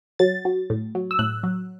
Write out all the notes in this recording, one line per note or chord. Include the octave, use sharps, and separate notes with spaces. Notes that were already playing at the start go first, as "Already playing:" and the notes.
F#3 A6
F#3
A2
F#3
E6
A2 F#6
F#3